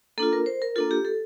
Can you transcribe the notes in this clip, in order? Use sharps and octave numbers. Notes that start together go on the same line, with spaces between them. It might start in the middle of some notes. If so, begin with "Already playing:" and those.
A#3 D4 F4 A4
A#4
C5
A#4
A#3 D4 F4 A4
G4
A4